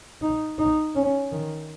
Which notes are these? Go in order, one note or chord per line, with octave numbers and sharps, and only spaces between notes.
D#4
D#4
C#4
D#3